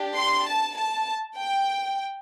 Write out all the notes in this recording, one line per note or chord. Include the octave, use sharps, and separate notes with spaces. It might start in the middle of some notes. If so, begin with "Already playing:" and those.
Already playing: D4 G4
C6
A5
A5
G5